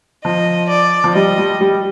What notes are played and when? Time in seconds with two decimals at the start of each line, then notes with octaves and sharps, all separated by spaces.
0.25 F3 D#5
0.70 D5
1.04 F3
1.15 G3 D#5
1.38 G3
1.61 G3